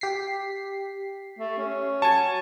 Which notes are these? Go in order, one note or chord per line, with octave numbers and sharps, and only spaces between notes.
G4 B6 C7
A3
C#4
F#3 G#5 A5 C#6